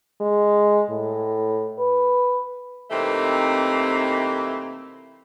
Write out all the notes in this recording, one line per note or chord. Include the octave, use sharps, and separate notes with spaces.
G#3
A2
B4
C3 E3 A3 A#3 C4 D#4